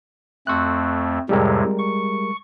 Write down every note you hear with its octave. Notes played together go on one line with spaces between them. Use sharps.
F2 A3 C4 C#6 F#6
F2 A2 C3 G3 G#3 A#4
C#6